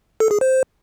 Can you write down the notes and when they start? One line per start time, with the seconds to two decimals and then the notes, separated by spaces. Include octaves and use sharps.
0.20 A4
0.31 G#4
0.41 C5